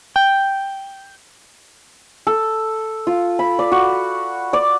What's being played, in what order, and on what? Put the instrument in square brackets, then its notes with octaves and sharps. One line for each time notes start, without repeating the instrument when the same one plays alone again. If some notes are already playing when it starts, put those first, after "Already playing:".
[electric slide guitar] G5
[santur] A4
F4
B5
D5
F#4
D5